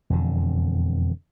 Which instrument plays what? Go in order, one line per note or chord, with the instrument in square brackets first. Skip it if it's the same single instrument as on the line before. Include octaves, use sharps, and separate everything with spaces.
[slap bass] E1 F2 D3